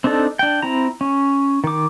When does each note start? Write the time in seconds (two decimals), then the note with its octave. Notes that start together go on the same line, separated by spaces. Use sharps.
0.04 C4 D4 D#4 A4
0.39 D4 G5
0.62 C4 E4 A#5
1.01 C#4
1.64 D#3 D6